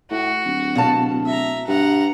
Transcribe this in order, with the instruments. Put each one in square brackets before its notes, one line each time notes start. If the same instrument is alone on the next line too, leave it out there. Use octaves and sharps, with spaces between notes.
[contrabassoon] A2 [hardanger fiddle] F#4
[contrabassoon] D1
[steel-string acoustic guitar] B2 F5 A5
[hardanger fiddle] E5 A#5
[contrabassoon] G2 [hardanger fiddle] F#5 A#5